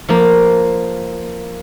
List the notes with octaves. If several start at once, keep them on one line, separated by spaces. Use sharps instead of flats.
F3 A#3